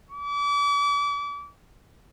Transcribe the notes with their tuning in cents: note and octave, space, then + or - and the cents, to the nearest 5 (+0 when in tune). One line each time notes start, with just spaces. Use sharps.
D6 -35